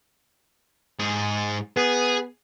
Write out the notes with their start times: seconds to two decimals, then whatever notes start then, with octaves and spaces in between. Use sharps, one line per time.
0.99 G#2 G#4
1.77 B3 G#4